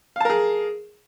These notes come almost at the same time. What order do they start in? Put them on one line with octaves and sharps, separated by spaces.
F5 A5 A#4 G#4